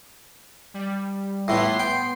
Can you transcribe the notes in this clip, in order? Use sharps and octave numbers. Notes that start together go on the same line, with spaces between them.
G3
A2 E3 B3 C6 C7
G5